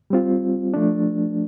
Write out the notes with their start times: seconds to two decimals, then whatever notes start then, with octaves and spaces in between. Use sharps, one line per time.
0.10 G3 C4 F4
0.74 F3 A3 D4